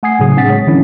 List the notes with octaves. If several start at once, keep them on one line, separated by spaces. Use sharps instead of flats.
A3 F#5 G#5 D#6 G#6 C7
A2 C#3 F#3 G#4 D#6
C4 D4 F#5 A6 B6
G#3 C#5
D3 D#3 F3 C#4 D4 E4